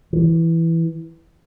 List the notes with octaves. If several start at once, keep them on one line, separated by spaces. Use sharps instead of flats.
E3